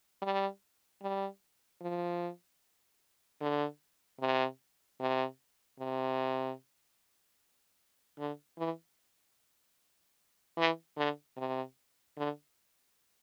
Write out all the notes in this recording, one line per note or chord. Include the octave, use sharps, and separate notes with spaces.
G3
G3
F3
D3
C3
C3
C3
D3
E3
E3
D3
C3
D3